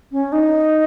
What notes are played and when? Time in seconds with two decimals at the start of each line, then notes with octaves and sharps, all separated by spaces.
0.12 C#4
0.32 D#4